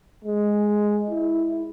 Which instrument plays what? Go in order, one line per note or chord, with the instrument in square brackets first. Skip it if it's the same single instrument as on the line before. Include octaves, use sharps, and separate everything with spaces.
[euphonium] G#3
E4